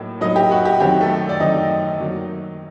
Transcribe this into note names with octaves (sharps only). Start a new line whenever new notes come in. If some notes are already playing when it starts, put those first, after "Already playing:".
Already playing: A2 F#3 A#3 D#4
A2 F#3 A#3 D#4 D#5
G4
F#4
G4
F#2 D#3 F#3 C4 D#4 G4
A3 A4
D5
F#2 D#3 F#3 C4 D#4 D#5
D#3 F#3 A#3